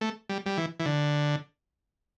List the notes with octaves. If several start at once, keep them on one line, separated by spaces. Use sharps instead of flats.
A3
G3
G3
E3
E3
D3